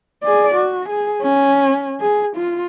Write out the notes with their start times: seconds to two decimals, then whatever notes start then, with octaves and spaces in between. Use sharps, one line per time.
0.24 G#4 D5
0.55 F#4
0.89 G#4
1.22 C#4
2.00 G#4
2.36 F4